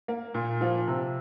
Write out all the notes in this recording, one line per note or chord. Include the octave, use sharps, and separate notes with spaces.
A#3
A#2
F3 F4
C3